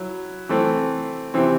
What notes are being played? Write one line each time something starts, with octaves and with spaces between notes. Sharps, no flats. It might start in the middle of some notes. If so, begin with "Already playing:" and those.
Already playing: F#3 E4
E3 A3 C4
C3 E3 C4